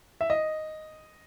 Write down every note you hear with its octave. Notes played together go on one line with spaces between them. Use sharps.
E5
D#5